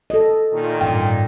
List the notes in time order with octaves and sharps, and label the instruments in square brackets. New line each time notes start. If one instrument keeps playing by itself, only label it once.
[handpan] A4 D#5
[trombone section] A#2 D#3
[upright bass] A1 G2 [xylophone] G5